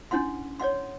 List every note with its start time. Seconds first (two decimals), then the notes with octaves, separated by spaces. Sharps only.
0.11 C#4 D4 E4 F#5 C6
0.59 C#5 D5 F#5 C6